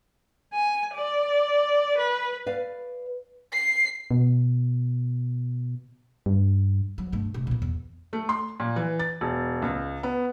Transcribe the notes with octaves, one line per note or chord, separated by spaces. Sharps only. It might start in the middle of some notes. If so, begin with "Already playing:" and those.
G#5
D5
B4
B4 D5 F5
C7
B2
G2
F#3
G2 A3
D1 C3
A#2 B3
E2
A3
C6
A#2
E3
A6
E1
C#2
B3